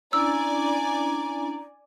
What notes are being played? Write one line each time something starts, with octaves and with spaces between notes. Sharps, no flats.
C#4 D4 E4 D5 G#5 A#5 E6